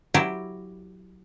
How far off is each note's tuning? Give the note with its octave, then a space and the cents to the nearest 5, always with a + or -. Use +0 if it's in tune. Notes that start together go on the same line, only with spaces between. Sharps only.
F#3 +0 E4 +0 G4 +0